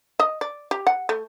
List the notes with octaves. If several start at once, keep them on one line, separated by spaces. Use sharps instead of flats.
D#5
D5
G4
F#5
A3